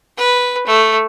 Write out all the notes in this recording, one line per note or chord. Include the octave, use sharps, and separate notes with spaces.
B4
A3